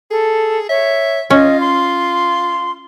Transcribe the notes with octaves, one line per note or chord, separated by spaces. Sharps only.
G#4 A4
C#5 E5
C#4 F4 D#5
C6